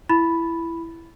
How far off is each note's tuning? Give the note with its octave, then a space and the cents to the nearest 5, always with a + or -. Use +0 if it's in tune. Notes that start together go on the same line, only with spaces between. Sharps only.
E4 +15 B5 +0